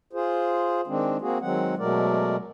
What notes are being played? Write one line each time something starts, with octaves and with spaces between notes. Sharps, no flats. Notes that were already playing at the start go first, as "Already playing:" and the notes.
F4 G#4 C5
D#3 G#3 C4 D4
A#3 C4 F#4 G#4
D#3 F#3 G#3 C4 F#5
B2 F#3 G#3 A3 A#4 D5